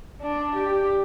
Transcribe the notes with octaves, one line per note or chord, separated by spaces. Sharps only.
D4
G4